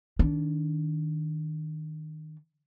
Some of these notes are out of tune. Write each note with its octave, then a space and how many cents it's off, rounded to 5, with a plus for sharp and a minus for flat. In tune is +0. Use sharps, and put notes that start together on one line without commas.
D#3 +0 D4 -25